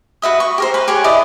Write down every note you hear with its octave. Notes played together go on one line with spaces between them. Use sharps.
F#4 B4 E5 D#6
C#6
G4 A#4 C5
B4 B5
G4 G#4 C#5 F#5
E4 D5 D#5